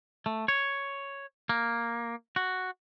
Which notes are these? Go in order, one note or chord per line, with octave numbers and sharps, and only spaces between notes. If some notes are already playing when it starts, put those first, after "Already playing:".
A3
C#5
A#3
F#4